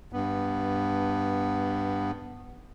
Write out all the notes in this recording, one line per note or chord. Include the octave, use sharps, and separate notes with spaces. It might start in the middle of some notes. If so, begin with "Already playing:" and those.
G2 B3